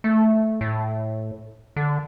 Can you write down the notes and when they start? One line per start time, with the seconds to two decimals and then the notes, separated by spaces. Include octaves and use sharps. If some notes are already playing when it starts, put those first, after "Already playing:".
0.04 A3
0.61 A2
1.76 D3